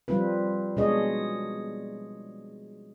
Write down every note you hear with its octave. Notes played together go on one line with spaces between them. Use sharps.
F3 G3 C4 F4 B4
B2 G#3 D4 G#4 C#5 D#5